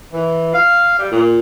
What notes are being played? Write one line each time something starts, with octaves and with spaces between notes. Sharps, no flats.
E3
F5
G3
A#2